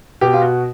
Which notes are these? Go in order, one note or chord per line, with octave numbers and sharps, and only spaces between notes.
B2 G4
F4
F#4